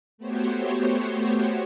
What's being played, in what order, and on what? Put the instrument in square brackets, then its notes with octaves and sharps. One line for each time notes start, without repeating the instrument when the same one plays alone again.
[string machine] A3 B3 F#4 G4 C5 C#5